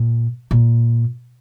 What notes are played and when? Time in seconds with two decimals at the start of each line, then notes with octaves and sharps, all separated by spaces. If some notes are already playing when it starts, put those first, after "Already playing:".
Already playing: A#2
0.51 A#2